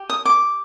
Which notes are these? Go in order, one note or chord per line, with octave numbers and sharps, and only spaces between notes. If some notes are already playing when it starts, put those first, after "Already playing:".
Already playing: G4
D#6
D6